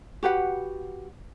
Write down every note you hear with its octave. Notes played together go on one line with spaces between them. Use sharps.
F#4 G4 B4 F#5